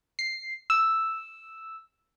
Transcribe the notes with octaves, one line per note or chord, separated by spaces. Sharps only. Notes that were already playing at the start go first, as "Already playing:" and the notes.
C7
E6